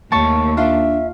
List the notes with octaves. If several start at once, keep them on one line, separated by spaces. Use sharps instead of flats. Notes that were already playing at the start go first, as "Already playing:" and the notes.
D#2 A3 A#3 C#5 A5 C#6
D4 F4 E5